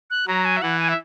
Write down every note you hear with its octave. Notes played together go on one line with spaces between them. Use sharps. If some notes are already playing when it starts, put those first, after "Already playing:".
F#6
F#3 A#5
G#5
E5
E3 F#5
G#5
E5